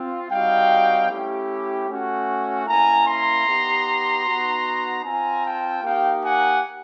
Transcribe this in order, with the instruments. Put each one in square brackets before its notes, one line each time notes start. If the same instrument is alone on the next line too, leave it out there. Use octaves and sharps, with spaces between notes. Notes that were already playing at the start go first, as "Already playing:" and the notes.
Already playing: [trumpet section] C4 F4
G3 C4 D#4 F#4 F5 G5
A3 C#4 E4 G4
A3 C#4 F#4
A#3 C#4 E4 G#5 A#5
A#5 C6
B3 D#4 G4
B3 D#4 F#4
C4 F4 G#5 A#5
G5 A5
A#3 D#4 G4 F5 G5
F#5 G#5